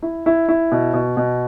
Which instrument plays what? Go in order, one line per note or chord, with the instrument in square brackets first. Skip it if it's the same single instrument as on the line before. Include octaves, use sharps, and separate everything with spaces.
[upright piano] E4
E4
E4
B2
B2
B2